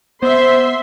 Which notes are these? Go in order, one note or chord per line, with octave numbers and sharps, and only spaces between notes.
B3 C5 E5 C6